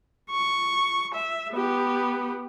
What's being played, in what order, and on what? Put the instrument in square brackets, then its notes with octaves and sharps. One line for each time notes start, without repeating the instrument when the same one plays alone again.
[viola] C#6
E5
B3 G4